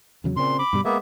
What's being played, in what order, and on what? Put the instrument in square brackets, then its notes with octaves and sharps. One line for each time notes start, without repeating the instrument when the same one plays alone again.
[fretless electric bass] E2 C#3 F#3
[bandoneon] A#2 C6 [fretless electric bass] C#3 C4
[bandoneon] B5 D6
[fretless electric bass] G2 B2 G3
[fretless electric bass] G#3 [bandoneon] A#3 B3 E5